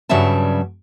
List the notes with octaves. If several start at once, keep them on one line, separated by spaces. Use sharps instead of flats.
G2 C#3 F#3 G3 E5 A5